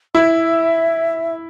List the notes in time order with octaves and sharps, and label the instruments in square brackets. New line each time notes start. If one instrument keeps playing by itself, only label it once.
[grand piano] E4 [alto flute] E5